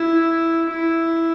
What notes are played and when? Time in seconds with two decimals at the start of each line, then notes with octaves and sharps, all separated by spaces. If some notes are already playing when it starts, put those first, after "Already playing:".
Already playing: E4
0.72 E4